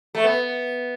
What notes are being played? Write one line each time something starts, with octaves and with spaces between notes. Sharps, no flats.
A3
B3